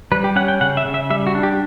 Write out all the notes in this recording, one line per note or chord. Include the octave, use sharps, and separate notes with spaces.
G3 B4
G4
C#4 F#5
G5
C#3 F#5
E5
C#3
E5
G3 E5
F#4
D4
G4